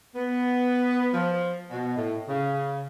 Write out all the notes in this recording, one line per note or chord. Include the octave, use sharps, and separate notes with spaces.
B3
F3
B2
A2
C#3